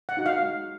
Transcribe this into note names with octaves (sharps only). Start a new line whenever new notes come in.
F#5
D#4 F#4
F5
G#3